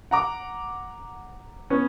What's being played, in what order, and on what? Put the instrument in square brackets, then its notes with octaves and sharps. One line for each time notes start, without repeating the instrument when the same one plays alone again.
[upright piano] F#5 A#5 D6
B3 C#4